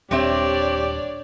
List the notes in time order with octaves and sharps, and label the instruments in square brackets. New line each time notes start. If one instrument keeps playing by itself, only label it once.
[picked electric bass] D#1 [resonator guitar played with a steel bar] G3 C4 E5 [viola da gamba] D4 C#5 D5 [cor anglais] G4